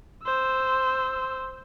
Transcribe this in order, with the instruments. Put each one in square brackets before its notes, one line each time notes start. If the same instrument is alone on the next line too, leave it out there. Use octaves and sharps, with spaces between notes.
[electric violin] C5 E6